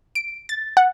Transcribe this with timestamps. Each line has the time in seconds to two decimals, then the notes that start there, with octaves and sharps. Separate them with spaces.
0.15 D7
0.49 A6
0.77 F#5